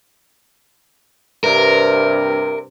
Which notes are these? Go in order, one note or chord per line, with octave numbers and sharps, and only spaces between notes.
G2 C3 A#4